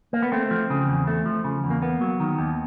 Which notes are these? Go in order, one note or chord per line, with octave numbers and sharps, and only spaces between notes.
A#3
B3
A3 C4
F3
C#3
E2
A3
F3
C#3
E2
A#3
A#3 B3
F#3
D#3
D#2